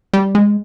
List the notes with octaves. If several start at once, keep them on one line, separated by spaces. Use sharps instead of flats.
G3
G#3